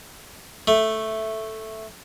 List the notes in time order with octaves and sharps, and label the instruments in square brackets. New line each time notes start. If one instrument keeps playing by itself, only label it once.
[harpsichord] A3